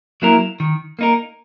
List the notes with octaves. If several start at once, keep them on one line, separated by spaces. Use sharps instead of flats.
F#3 A#3 E4 A#4
D#3
A#3 D#4 A#4